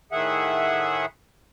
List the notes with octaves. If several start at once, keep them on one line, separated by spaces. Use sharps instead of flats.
A2 D#3 G#4 E5 F#5